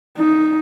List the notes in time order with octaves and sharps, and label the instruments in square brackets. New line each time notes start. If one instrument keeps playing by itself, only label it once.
[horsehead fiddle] D#4